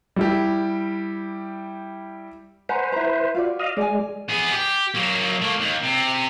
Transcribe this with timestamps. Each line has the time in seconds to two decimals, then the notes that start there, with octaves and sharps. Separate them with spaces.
0.16 G3 E4 G4
2.69 B4 C5 F#5 G#5 A#5
2.92 E4 A#5
3.35 F4 F#4 D5
3.60 D#5 F5
3.77 G#3 D5 G#5
4.29 B3 G#4
4.52 G4
4.94 F#3 A#3
5.42 A3 A#3
5.60 D#2
5.83 C3